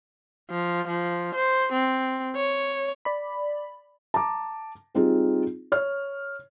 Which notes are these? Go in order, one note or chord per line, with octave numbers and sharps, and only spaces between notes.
F3
F3
C5
C4
C#5
D5 B5
A5 A#5 D6
G3 C4 D#4 F4 G#4
C#5 F6